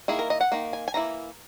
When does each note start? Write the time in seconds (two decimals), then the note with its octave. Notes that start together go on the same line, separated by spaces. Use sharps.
0.08 D#3 A#3 E4 G#4
0.19 A#4
0.30 D#5
0.41 F#5
0.52 D#3 A#3
0.73 G#5
0.88 G#5
0.94 E3 A#3 E4 A#5